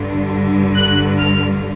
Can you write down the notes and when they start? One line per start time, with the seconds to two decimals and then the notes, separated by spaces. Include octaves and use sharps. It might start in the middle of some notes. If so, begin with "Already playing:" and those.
Already playing: G2 D3
0.75 F#6
1.18 F6